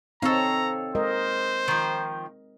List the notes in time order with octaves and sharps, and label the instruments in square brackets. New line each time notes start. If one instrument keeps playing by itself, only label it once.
[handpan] C4 D#4 [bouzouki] A4 C#5 F5 [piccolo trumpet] A#5
[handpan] G#3 A#4 D#5 [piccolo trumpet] C5
[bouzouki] D#3 F3